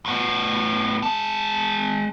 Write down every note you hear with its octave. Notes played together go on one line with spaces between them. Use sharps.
A2 B3
G#3 A5